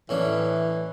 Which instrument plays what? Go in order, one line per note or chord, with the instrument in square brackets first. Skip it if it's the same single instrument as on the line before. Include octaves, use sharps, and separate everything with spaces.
[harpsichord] A2 C#4 D4 [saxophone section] E3